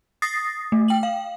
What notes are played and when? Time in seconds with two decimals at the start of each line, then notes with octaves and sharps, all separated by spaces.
0.22 D#6 A6 A#6 C7
0.72 A3
0.88 G5 F#7
1.03 F5